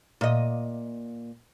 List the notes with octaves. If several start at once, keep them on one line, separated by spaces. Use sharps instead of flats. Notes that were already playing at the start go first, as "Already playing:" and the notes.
A#2 D#5